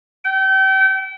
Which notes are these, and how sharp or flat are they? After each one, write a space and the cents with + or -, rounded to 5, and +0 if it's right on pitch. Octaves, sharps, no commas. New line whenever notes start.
G5 -35